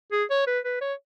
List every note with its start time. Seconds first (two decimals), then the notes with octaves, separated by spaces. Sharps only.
0.12 G#4
0.30 C#5
0.47 B4
0.65 B4
0.81 C#5